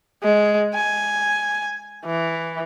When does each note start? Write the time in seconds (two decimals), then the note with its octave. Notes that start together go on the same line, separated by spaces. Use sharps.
0.23 G#3
0.75 G#5
2.05 E3